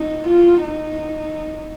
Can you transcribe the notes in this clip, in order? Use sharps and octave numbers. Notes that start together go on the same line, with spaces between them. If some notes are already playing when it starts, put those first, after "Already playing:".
Already playing: D#4
F4
D#4